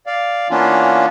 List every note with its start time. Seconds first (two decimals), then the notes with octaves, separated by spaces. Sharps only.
0.07 D5 F5
0.50 E3 A#3 B3 C#4 D4 F4